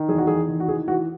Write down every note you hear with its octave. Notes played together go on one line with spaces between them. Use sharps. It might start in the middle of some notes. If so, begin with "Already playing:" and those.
Already playing: D#3
E2 G#4
F#4
E2 G#4
D#3
F#4
E3 G#4
E3 F#4